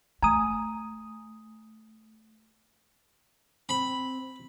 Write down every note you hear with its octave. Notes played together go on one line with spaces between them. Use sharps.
A3 G#5 A#5 D#6
C4 B5